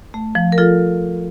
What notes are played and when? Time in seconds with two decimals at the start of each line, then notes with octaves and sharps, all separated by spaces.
0.14 A3
0.35 F3
0.52 A#4
0.58 F3 F4 A4